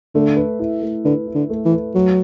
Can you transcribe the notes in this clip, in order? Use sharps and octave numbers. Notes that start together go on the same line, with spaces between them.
D3 A3
B4
E4
A3
D3 B4
E4
D3
A3
E3
B4
F#3 A3